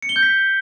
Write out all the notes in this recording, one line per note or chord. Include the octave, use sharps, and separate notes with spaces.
C#7
G7
G6
B6